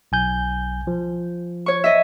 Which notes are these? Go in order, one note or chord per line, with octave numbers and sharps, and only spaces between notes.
B1 G#5 G6
F3
C#5 C#6
D#5 E5